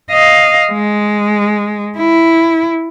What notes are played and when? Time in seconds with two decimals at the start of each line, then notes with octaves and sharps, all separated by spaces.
0.11 D#5 F5
0.72 G#3
1.98 E4